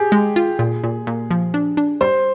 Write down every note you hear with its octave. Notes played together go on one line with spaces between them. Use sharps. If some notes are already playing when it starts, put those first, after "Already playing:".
Already playing: G4 G#4
G#3
F4
A#2
A#2
A#2
F3
D4
D4
G3 C5